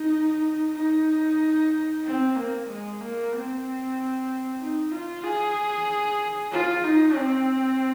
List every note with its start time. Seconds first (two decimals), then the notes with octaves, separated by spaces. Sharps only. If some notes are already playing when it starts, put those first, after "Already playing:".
Already playing: D#4
0.76 D#4
2.05 C4
2.36 A#3
2.68 G#3
3.01 A#3
3.32 C4
4.60 D#4
4.91 F4
5.24 G#4
6.52 F4
6.84 D#4
7.15 C4